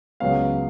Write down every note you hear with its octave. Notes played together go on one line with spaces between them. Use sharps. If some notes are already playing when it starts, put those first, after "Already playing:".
C#2 C#3 F#3 B3 F5